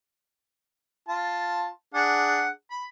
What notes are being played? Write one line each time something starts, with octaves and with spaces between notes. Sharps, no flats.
F4 A5
D4 G#4 F#5
B5